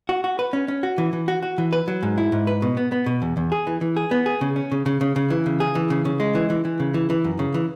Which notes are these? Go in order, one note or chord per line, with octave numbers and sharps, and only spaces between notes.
F#4
F#4
B4
C#4
C#4
F#4
E3
E3
F#4
F#4
E3
B4
F#3
G#2
E4
G#2
B4
B2
B3
B3
B2
E2
E2
G#4
E3
E3
G#4
B3
G#4
C#3
C#4
C#3
C#3
C#3
C#3
E3
C#3
G#4
E3
C#3
C#3
G#3
E3
E3
E3
C#3
E3
E3
F#2
C#3
E3